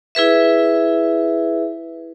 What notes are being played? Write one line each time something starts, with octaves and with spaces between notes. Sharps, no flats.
E4 G#4 B4 E5